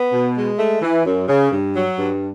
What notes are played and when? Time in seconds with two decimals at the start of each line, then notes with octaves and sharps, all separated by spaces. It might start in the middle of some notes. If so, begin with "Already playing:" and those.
Already playing: B3
0.12 B2
0.36 G#3
0.59 A3
0.82 E3
1.05 F#2
1.28 C#3
1.51 G2
1.75 F#3
1.98 G2